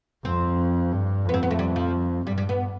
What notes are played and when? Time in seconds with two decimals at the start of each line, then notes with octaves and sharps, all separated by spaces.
0.25 F2 C4
0.93 G2
1.25 F2 B3
1.34 C4
1.43 B3
1.51 A3
1.59 G3
1.76 F3
2.26 G2 G3
2.38 G3
2.49 B3